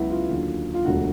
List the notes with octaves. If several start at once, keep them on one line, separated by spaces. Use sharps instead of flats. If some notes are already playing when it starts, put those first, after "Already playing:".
Already playing: C#2 C#3 F#3 B3 E4 F#4
F4
D#2 D3 F#3
F4
E1 D2 D3 F#4